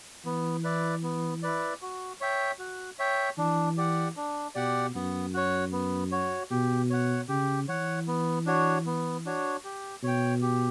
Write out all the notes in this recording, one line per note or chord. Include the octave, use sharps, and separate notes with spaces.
E3 B3
E4 B4 D5
B3
E4 B4 D5
F#4
C#5 E5 G5
F#4
C#5 E5 G5
E3 D4
G4 D5 F#5
D4
B2 G4 D5 F#5
F#2 B3
F#4 C#5
B3
F#4 C#5
B2 G4
C#5 F#5
C#3 G4
E3 C#5 F#5
B3
D4 F#4 C#5
B3
D4 F#4 C#5
G4
B2 C#5 G5
G4